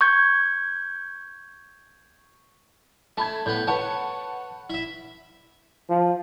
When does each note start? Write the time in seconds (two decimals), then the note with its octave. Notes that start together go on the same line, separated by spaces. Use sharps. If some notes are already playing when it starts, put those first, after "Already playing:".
0.01 C#6 G6 G#6
3.17 A3 A5 B5 G#6
3.46 A2 B3 G6
3.67 B4 C#5 F#5 A5
4.70 E4 E5
5.89 F3